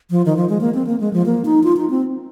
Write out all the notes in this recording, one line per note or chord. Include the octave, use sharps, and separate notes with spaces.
F3
D#3
F3
G#3
A#3
C4
A#3
G#3
F3
A#3
D#4
F4
D#4
C4